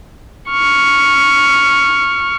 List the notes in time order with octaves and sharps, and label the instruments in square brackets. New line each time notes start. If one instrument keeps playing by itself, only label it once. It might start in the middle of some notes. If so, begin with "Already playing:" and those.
[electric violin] C#6 F6